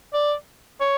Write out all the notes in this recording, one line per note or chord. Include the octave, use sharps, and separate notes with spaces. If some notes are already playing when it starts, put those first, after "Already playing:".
D5
C#5